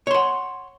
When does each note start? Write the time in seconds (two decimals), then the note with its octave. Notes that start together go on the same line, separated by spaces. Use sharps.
0.07 C#5
0.11 C6
0.14 F#5